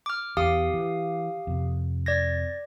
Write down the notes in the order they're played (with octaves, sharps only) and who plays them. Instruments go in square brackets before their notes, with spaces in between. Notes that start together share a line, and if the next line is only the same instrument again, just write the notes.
[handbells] D6 F6
[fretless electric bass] E2 B3 [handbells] G4 F5 D#6
[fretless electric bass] E3
F2 C3
[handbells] D5 G#6 A#6